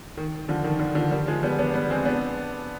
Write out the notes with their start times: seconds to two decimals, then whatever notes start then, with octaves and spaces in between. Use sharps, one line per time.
0.17 D#3
0.48 D3 F3
0.64 D#3
0.79 D3
0.95 D3 F3
1.11 D#3 G3
1.27 F3 G#3
1.43 G3 B3
1.59 B3 D4
1.74 G3 B3
1.90 G#3 C4
2.05 B3 D4